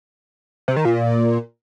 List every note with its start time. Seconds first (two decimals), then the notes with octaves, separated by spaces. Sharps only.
0.68 C3
0.76 D#3
0.85 A#2